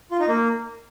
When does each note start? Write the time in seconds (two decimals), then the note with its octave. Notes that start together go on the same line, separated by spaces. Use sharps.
0.11 F4
0.20 D#4
0.28 A#3